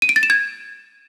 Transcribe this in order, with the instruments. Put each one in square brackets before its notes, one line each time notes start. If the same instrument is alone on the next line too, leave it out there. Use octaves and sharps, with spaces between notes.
[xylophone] D#7
D7
A6
E7
G#6